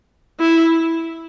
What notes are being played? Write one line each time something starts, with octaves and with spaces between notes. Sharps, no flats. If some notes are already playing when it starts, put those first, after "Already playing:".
E4